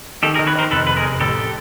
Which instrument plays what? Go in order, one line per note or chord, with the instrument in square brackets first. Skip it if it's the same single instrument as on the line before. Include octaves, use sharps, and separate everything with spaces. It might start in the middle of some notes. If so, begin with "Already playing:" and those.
[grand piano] D#3 [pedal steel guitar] G4 A4
[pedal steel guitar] G#4 A#4
[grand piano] D#3
[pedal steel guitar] B4 C#5
[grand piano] D#3 [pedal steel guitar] A#4 C5
[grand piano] F1 [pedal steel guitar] A4 B4
[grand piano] F1 [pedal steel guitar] B4
[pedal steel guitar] G#4 A#4
[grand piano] F1
[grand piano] A1 [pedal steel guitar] G4 A4